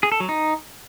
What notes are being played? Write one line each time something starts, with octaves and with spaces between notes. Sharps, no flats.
G#4
A4
F#3
D#4